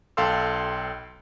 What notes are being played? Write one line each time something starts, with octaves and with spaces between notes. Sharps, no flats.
B1 A4 F5 G5 C6 E6